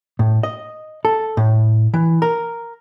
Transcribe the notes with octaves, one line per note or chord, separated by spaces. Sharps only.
A2
D#5
A4
A2
E3
A#4